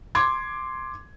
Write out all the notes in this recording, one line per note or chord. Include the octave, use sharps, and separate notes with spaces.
C6 D6 G#6